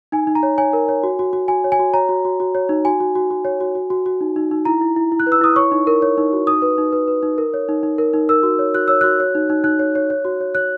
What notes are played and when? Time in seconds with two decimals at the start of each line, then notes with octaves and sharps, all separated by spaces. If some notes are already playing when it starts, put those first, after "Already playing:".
0.12 D#4 G#5
0.27 D#4
0.35 A#5
0.43 C#5
0.58 C#5 G#5
0.73 A#4
0.89 C#5
1.03 F#4
1.19 F#4
1.33 F#4
1.48 F#4 G#5
1.64 C#5
1.72 G#5
1.79 F#4
1.93 C#5 A#5
2.09 F#4
2.25 F#4
2.40 F#4
2.55 C#5
2.69 D#4
2.85 F#4 G#5
3.00 F#4
3.15 F#4
3.31 F#4
3.45 C#5
3.60 F#4
3.75 F#4
3.90 F#4
4.06 F#4
4.21 D#4
4.36 D#4
4.51 D#4
4.65 E4 A#5
4.81 E4
4.96 E4
5.12 E4
5.20 F#6
5.27 B4
5.32 E6
5.41 E4 D#6
5.56 C#5 C#6
5.71 D#4
5.87 A#4
6.02 C#5
6.18 D#4
6.33 F#4
6.47 D#4 D#6
6.62 B4
6.78 D#4
6.93 B4
7.08 B4
7.23 D#4
7.38 A#4
7.54 C#5
7.69 D#4
7.83 D#4
7.98 A#4
8.13 D#4
8.29 A#4 E6
8.43 F#4
8.59 C#5
8.74 F#4 F#6
8.88 C#5 E6
9.01 F#4 F#6
9.20 C#5
9.35 D#4
9.50 D#4
9.64 D#4 F#6
9.79 C#5
9.95 C#5
10.10 C#5
10.25 F#4
10.41 C#5
10.55 C#5 F#6